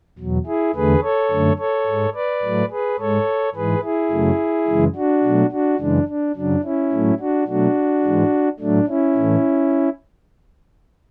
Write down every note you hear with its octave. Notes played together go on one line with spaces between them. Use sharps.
E2 B2 F#3
E4 G#4
E2 D3 A3 G#4 B4
A4 C#5
F#2 D3 A3
A4 C#5
G#2 G#3
B4 D5
A2 F#3 A3
G#4 B4
G#2 G#3 A4 C#5
G#2 E3 G#3 G#4 B4
E4 G#4
F#2 C#3 F#3 A3
F#2 C#3 E3 G#3
D4 F#4
B2 F#3 A3
D4 F#4
F#2 C#3 E3 G#3 D4
D4
F#2 C#3 F#3 D4
C#4 E4
A2 F#3 A3
D4 F#4
B2 F#3 A3 D4 F#4
G#2 E3 G#3
A2 F#3 A3 D4
C#4 E4
A2 E3 A3